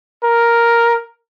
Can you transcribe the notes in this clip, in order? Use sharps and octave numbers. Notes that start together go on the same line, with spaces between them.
A#4